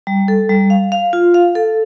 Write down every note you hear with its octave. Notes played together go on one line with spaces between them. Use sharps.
G3
A4
G3
F5
F5
F4
F5
A4